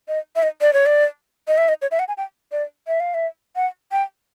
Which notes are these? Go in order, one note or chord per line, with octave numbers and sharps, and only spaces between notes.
D#5
E5
D#5
D5
C#5
D5
D#5
E5
D#5
C#5
E5
F#5
G#5
G5
D5
E5
F5
E5
F#5
G5